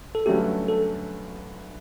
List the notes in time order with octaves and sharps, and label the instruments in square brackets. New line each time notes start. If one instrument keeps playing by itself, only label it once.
[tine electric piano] A4
[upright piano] G2 D3 F#3 A3 C#4 [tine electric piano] G4
[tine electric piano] A4